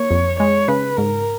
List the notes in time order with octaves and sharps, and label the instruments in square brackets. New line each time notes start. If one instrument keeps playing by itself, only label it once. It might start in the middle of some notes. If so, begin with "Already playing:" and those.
Already playing: [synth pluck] A#3 [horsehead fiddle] C#5
[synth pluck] F2
[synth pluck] G#3 [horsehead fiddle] C#5
[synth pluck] C#3 [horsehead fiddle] B4
[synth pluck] G#2 [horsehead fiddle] A#4